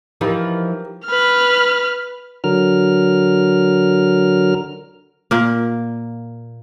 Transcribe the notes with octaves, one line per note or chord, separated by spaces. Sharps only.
E3 F3 D#4 G4 A#4
B4 F6
D3 F#3 A#4 F6
A#2 A#3